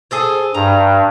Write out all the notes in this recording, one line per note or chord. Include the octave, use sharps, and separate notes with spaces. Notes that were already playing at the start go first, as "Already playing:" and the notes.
G#4 A4 C5
G2 A#5